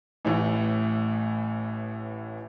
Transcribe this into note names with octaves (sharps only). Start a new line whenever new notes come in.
A1 A2 E3